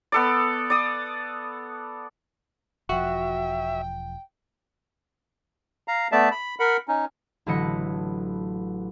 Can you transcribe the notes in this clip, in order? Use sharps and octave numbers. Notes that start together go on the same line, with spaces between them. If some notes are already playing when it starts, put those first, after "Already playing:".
B3 A4 D5
D5 D#6
E1 F3 F#4 E5 G5
F5 A#5
A3 B3 D5 E5 A5
B5
A#4 F#5 B5
C#4 D#4
A1 D3 F#3 B4 D#5 C#7